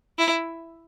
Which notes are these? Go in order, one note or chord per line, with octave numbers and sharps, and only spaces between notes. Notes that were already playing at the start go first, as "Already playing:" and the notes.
E4